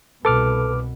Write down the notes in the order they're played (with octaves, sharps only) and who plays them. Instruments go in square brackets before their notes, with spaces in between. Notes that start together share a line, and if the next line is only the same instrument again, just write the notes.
[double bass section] C2 B2 [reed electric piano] A4 [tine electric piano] B4 D6 F6